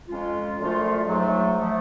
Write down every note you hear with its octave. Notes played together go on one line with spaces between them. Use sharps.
F2 F3 G#3 C#4 F4
F#2 D3 F3 A3 F4
G#2 F#3 A3
F3 A3